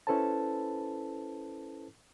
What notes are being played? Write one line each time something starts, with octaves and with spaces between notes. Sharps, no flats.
C#4 E4 A4 B4 C5 A5